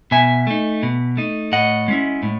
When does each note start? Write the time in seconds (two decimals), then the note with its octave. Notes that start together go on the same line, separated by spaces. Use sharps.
0.11 B2 E5 G#5
0.47 A3 D#4
0.83 B2
1.17 A3 D#4
1.52 A2 D#5 F#5
1.88 G#3 C#4 E4
2.23 A2